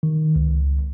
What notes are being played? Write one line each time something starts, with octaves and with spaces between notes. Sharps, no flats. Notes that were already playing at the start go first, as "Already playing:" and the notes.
D#3
C#2